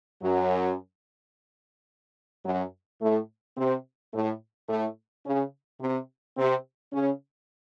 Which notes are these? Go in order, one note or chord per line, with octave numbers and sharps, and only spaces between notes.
F#2 F#3
F#2 F#3
A2 A3
C3 C4
A2 A3
A2 A3
C#3 C#4
C3 C4
C3 C4
C#3 C#4